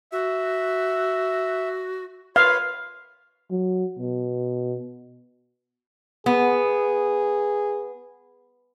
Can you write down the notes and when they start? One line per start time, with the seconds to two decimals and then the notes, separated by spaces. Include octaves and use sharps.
0.12 F#4 E5
2.36 B4 C#5 F5 B5 C6
3.51 F#3
3.99 B2
6.26 B3 G#4